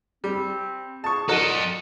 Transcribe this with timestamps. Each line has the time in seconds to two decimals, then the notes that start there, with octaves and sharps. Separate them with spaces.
0.24 G3 C4
1.04 F4 G#4 A5 C#6
1.29 A#2 D#4 F#4 A4 A#4 D#5